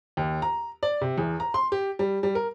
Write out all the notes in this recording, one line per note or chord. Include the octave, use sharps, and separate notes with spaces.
D#2
A#5
D5
C3
E2
A#5
C6
G4
G3
G3
A#4